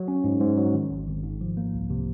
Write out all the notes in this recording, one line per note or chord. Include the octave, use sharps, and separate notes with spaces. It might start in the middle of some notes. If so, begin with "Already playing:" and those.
Already playing: F#3
C#4
G#2
G#2
F#3
D#3
G#1
G#1
G#2
F3
A#3
C2
C3